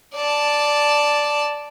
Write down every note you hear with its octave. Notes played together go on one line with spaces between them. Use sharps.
D5 A5